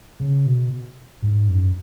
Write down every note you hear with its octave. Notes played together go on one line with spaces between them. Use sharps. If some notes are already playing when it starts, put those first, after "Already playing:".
C#3
B2
G#2
F#2